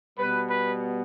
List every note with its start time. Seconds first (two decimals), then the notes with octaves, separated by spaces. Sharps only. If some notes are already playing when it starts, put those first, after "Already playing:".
0.18 B2 G3 B3 B4
0.50 B4